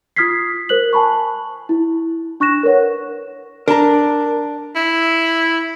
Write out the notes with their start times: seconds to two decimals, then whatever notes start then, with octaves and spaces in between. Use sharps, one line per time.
0.16 F4 D#6 F6 G#6 B6 C7
0.69 A#4 C5 F#6 F#7
0.93 G#5 A5 B5 C#6
1.69 E4
2.40 D4 C#6 F#6 A#6 E7
2.63 A#4 B4 C#5 F#5
3.68 D4 A#4 A5 A#5
4.75 E4